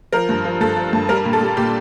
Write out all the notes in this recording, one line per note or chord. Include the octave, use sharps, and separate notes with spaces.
F3 A#4
G2
F3
G2 A4
F3
G2
G3 A#4
A#2
A4
G3
A#2 G4